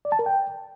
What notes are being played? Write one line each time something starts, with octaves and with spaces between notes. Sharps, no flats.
D5
A5
A#4
G5